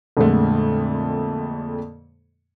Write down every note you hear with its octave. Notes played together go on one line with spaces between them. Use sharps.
F2 A#2 D3 G#3 A3